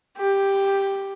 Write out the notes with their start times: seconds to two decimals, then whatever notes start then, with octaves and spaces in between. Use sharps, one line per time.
0.17 G4